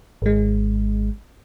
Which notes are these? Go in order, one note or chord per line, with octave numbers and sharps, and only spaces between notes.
G#1 G#3